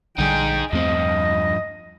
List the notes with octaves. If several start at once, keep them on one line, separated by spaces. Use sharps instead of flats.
A#1 D3 G3 D#4 G#4 G5
E2 G2 F3 A3 C4 D#5